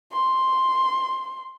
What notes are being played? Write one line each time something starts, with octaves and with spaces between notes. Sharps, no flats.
C6